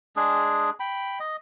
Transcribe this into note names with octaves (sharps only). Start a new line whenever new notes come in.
G#3 D4 G#4
G5 B5
D#5